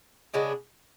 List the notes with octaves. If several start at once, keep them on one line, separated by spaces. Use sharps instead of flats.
C#3 G#3 B3 D4